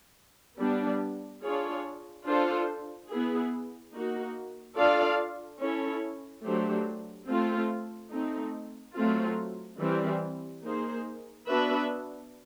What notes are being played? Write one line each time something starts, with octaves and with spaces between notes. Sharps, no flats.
G3 B3 D4
D4 F4 G#4 C#5
D4 F4 A4 C5
B3 E4 G#4
A#3 D#4 F#4
D4 F4 A4 D5 F5
C#4 E4 A4 C#5
F#3 A3 D4 G4 C5
A3 C4 F4
A3 C4 D#4
F#3 A3 C4 F4
E3 G3 C4
A#3 D#4 G#4 C5
B3 D4 F#4 B4 E5